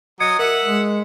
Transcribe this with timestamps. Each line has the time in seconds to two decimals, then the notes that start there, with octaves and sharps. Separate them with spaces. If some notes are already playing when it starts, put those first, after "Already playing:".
0.20 F#3 D#5 D#6 G#6 C#7
0.39 A#4 E5 F#5
0.65 G#3